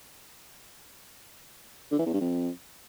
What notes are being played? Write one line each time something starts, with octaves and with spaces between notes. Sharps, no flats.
D3
E3
E2
G2
F2